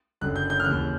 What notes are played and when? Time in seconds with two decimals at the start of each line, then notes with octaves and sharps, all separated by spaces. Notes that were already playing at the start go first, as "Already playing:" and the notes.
0.21 F#1 F#2 D3 F#6
0.36 G6
0.50 G6
0.60 F6
0.65 D#2 C#3 E3 F#6